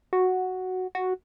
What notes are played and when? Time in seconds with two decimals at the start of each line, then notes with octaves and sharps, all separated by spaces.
0.13 F#4
0.95 F#4